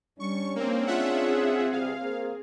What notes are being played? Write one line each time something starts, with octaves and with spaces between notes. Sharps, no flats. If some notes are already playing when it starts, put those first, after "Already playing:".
G3 C#4 D4 C#6
A#3 C4
C4 F4 G#4 E5 F#5
E2 G2 C3 F5
A#3 C5